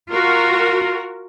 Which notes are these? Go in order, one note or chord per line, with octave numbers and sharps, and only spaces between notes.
F4 F#4 A#4